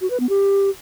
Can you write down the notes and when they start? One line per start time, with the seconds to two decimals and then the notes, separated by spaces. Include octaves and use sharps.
0.01 F#4
0.10 B4
0.20 B3
0.29 G4